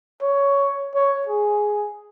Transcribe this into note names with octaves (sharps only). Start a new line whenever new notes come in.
C#5
C#5
G#4